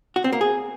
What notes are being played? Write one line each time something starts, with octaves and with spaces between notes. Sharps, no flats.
F#4
C4
A#3
G#4